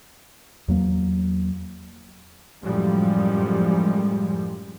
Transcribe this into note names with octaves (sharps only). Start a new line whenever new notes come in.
E2 F#3 A#3
F#2 A2 F3 G3 G#3